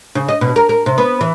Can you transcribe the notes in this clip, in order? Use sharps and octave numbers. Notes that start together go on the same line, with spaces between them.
C#3
D#5
B2
A#4
A#4
C3
B3
E3